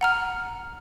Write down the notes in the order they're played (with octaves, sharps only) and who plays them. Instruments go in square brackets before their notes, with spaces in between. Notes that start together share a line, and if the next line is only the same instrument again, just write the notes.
[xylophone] F#5 A#5 F6